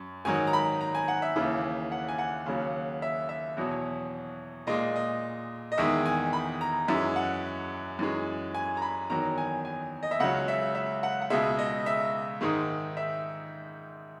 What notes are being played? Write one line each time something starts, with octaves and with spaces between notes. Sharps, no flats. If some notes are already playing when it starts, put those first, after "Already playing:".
Already playing: F#2
G#2 D#3 F#3 G#5
A#5
B5
A#5
G#5
F#5
E5
D#2 C#3 E3
F#5
G#5
F#5
D#2 C#3 F#3
E5
E5
E2 B2 F#3
A#2 G#3 D#5
D#5
D#5
E2 D#3 G#3 E5
G#5
B5
A#5
F#2 E3 G#3 E5
F#5
F#2 E3 G#3
G#5
A#5
B5
E2 D#3 F#3 A#5
G#5
G#5
D#5
E5
C#2 C#3 F#3 F#5
E5
E5
F#5
F#5
C#2 B2 G#3 E5
D#5
E5
G#2 D#3 G#3
E5